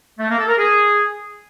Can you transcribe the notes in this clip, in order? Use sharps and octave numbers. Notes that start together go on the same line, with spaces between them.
A3
A#3
A4
A#4
G#4